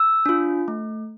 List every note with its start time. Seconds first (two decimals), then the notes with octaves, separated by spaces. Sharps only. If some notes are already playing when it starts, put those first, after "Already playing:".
Already playing: E6
0.26 D4 F4
0.68 A3